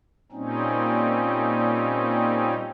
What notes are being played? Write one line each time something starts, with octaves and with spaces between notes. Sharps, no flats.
A#2 G3 C4 C#4 D#4